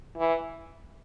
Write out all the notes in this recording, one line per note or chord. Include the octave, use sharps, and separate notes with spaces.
E3